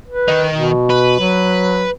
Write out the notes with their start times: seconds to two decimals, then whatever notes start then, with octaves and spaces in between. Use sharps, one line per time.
0.08 B4
0.28 D#3 D#4
0.53 B2
0.90 B4
1.19 F#3